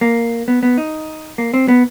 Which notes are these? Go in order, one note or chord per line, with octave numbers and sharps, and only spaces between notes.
A#3
B3
B3
D#4
A#3
C4
B3